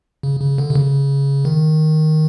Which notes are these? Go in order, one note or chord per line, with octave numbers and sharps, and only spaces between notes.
C#3
C#3
D3
C3
C#3
D#3